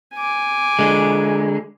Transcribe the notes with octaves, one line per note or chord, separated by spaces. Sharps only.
G#5 D6
D3 G#3